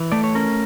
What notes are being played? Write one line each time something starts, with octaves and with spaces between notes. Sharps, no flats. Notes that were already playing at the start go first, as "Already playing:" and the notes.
Already playing: E3
A3 D5
C#5
C#4 A#4